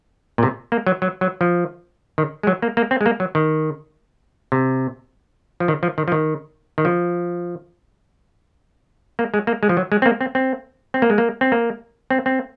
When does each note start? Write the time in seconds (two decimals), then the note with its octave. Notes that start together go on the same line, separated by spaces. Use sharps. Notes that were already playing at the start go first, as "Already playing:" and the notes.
0.38 A#2
0.43 C3
0.72 A#3
0.87 F#3
1.02 F#3
1.21 F#3
1.41 F3
2.18 D#3
2.43 G#3
2.47 F#3
2.62 A#3
2.77 A#3
2.91 C4
3.01 G#3
3.06 A#3
3.20 F#3
3.35 D#3
4.52 C3
5.60 F3
5.68 D#3
5.83 F3
5.98 D#3
6.08 F3
6.12 D#3
6.78 D#3
6.85 F3
9.19 A#3
9.34 G#3
9.47 A#3
9.63 G#3
9.69 F3
9.77 F#3
9.92 G#3
10.02 C4
10.06 A#3
10.21 C4
10.35 C4
10.94 C4
11.02 A#3
11.10 G#3
11.18 A#3
11.41 C4
11.52 A#3
12.10 C4
12.26 C4